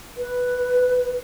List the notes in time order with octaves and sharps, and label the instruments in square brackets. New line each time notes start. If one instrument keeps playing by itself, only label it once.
[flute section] B4